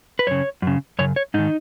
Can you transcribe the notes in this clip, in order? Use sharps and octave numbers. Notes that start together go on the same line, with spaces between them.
B4
F#2 C#3 C#5
F#2 C#3
F#2 C#3 C#5
C#5
G#2 D#3 D#4